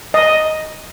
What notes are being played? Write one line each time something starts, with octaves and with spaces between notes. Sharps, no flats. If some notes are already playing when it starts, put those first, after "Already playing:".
D#5